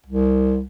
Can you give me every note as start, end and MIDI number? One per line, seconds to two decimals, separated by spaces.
0.06 0.66 36